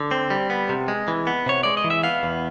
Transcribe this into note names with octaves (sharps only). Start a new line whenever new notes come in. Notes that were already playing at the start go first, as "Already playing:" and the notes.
Already playing: D3
C4
G3
B3
C3
G#3
E3
B3
C3 C#5
G#3 D5
D#5
E3
E5
B3 F5
E2